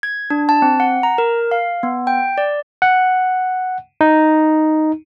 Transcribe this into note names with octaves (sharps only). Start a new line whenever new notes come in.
G#6
D4
A5
C4
F#5
A#5
A#4
F5
B3
G5
D5
F#5
D#4